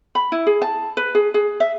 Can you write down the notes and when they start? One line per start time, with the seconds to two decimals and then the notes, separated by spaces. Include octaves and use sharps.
0.15 B5
0.32 E4
0.47 G#4
0.62 A5
0.97 B4
1.15 G#4
1.34 G#4
1.60 E5